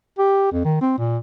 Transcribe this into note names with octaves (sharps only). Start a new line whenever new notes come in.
G4
F2
D#3
C4
A#2